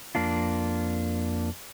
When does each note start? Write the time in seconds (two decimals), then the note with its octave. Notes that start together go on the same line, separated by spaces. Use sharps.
0.15 F2 A#3 D4 F4